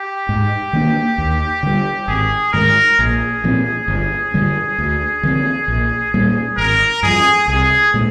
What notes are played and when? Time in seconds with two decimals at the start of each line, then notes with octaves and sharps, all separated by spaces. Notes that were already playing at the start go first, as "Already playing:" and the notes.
Already playing: G4
0.29 G#2
0.73 D#3 A#3 D4
1.18 D#2
1.63 D3 G3
2.08 G#1 G#4
2.53 G#2 D#3 G#3 A#4
2.99 A#1 G#4
3.44 A#2 F3 C4
3.88 G1
4.34 G2 D3 G3
4.78 D2
5.23 D3 F3 C4
5.68 A#1
6.14 A#2 G3 A#3
6.58 G#1 A#4
7.03 G2 F3 G#4
7.48 C2 G#4
7.94 A#2 G#3